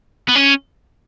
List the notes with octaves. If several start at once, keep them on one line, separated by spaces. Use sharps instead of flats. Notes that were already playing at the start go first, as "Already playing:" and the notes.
B3
C#4